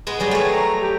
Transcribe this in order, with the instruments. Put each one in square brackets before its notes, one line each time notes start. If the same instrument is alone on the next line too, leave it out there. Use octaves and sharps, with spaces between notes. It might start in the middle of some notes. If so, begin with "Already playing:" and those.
[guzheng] G#3 B3 G#4
[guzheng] F#3 G3 F#4 [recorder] G#4
[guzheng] A3 C#5
[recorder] A#5
G4